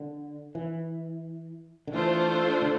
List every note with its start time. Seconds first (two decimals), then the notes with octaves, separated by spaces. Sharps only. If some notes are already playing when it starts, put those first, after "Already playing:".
Already playing: D3
0.55 E3
1.87 D3
1.93 E3 A3 D4 F4 A4 C5
2.62 D3